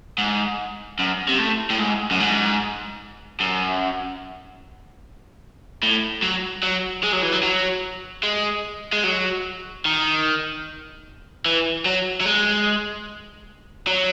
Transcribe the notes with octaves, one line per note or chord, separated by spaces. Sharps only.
G#2
F#2
C3
A2
A2
G#2
F#2
G#2
F#2
A2
F#3
F#3
G#3
F#3
E3
F#3
F#3
G#3
G#3
F#3
D#3
E3
F#3
F#3
G#3
F#3